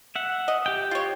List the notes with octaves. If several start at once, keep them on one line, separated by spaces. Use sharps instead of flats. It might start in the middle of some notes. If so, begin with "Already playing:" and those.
E5 F#5
D#5
G4 G5
F4 C#5